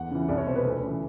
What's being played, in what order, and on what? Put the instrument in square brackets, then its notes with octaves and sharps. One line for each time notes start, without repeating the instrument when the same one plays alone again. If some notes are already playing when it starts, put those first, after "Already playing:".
Already playing: [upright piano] E2 F#5
C#3 E3
C2 D5
C#5
B2 C5
B4
D2 A4
C#3 E3